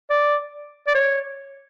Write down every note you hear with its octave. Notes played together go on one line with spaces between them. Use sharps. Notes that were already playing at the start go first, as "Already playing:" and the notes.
D5
D5
C#5